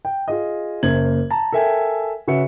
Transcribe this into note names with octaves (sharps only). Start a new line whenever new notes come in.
G5
F4 G#4 D#5
F#1 A#3 C5 G#6 F#7
A5 A#5
A4 A#4 E5 G5 G#5
C#3 F#4 B4 E5 C#7